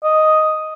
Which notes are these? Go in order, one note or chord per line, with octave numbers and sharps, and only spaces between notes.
D#5